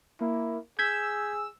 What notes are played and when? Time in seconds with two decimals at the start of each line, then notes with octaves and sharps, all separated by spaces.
0.21 A#3 E4
0.79 G#4 E6 G6 G#6 B6